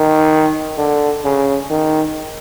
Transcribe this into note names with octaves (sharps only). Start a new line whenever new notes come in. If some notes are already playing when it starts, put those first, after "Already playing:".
Already playing: D#3
D3
C#3
D#3